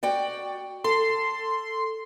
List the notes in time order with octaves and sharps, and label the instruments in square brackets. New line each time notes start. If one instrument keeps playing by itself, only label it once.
[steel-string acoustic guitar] F#4 D5 G5
[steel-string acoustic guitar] A4 [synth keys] C6